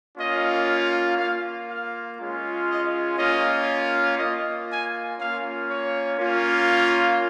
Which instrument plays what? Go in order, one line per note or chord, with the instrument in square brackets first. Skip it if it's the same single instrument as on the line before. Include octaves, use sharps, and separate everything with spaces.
[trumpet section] A#3 C#4 F4 D#5
A#3 F4 F5
F5
G#3 C#4 F4
D#5
A#3 C#4 F4 D#5
A#3 F4 D#5
G#5
A#3 C#4 F4 F5
C#5
A#3 C#4 F4